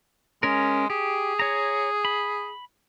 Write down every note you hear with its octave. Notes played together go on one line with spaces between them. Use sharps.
G#3 C#4 A#4
G4 G#4
C#5 A#5
B5